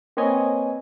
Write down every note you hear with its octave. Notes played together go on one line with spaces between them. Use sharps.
A#3 C4 B4 C#5 D#5 G#5